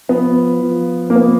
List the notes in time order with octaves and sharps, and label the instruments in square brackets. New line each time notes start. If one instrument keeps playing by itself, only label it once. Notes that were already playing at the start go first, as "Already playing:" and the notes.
[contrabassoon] F3 [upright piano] B3
[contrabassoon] F3
[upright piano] A#3
B3